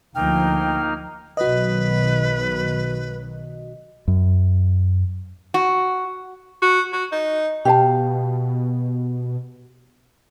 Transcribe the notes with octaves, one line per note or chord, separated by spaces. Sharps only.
D2 F3 A#3 D#4 G5 F6
B1 D#3 F#3 F#4 B4 D#5
F#2
F#4
F#4
F#4
D#4
B2 G4 F5 A5